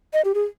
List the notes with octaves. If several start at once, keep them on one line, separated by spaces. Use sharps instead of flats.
D#5
G4
G#4